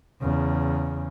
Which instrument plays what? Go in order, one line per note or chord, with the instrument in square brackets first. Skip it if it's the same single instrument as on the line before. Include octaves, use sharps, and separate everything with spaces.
[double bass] E2 C#3